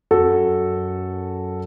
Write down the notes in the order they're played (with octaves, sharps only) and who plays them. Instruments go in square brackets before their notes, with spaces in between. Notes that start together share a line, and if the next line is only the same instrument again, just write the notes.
[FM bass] F#2 [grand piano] F#4 A4
[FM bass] F2
F#2